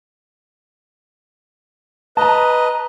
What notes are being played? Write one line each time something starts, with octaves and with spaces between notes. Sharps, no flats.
B4 D#5 A5 A#5